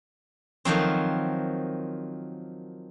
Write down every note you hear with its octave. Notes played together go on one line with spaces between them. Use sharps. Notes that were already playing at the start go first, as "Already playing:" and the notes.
D#3 F3 F#3 C4